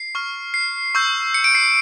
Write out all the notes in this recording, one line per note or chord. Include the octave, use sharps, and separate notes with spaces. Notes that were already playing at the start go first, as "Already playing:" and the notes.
Already playing: C7
C#6 F6
C7
C#6 E6 G6
C#7
D7
C7